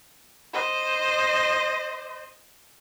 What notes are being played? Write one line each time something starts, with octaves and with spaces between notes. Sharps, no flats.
C5 D#5